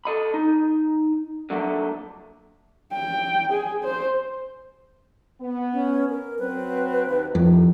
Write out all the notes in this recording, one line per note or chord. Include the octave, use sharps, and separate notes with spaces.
A4 D#5 B5
D#4
D3 F#3 A3 A#3
G5
G#4
C5
B3
C#4
A#4
F#3 C4 B4
D#2
F2 A2 C3 D#3